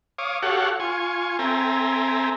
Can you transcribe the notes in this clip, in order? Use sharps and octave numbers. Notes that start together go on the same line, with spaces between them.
C#5 F5 D6 D#6
F#4 G4 A4 C#5 F5 F#5
F4 G#5 C#6
C4 A4 E5 G5 G#5 A#5